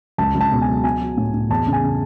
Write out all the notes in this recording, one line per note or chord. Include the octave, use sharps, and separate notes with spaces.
C#2 A5
C#2
A5
B2
G#5
F#3
B3 G#5
F#3
A2
A2
E2 A5
C#3
G#5
C#3